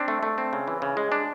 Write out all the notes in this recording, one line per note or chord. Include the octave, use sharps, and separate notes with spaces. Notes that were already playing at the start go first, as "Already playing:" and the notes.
Already playing: C4 D4
A3
A3
C4
C#3
E3
C#3
G#3
D4